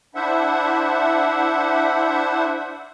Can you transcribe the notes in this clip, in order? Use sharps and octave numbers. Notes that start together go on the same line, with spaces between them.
D4 E4 C5 E5 F#5